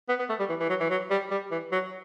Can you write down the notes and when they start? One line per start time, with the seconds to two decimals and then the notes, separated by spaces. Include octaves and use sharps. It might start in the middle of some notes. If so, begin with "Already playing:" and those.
0.09 B3
0.19 B3
0.29 A3
0.39 G3
0.49 E3
0.60 E3
0.69 F#3
0.80 E3
0.90 F#3
1.10 G3
1.31 G3
1.51 E3
1.72 F#3